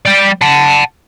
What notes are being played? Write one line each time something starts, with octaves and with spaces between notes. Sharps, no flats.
G3 D5
F#5 A5